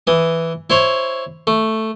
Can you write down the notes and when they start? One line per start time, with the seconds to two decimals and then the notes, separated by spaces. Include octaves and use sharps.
0.07 E3 D#6
0.70 E4 C5 C#5
1.47 A3